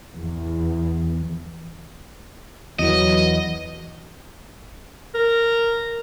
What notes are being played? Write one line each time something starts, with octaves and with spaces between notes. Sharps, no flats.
E2
E2 E3 F#3 B3 D#5
A#4